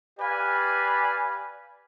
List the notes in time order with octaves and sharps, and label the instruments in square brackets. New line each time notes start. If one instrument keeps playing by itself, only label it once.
[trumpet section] G4 B4 D5 F5 G#5 B5